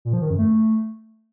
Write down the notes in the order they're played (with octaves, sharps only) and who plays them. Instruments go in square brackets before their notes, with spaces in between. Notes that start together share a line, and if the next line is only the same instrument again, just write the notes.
[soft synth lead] A#2
F3
D#3
F#2
A3